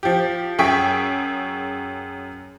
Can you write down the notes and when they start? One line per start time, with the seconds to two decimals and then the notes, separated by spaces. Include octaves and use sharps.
0.03 F3 G4
0.59 F#2 G#4 G5 C#6 B6